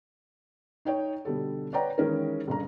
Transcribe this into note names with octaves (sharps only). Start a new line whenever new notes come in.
D#4 C#5 G5
B2 D3 G3 A4
B4 C#5 D5 F#5 G5 A#5
D#3 E3 G#3 C#4 E4 A#4
G1 C#3 A#5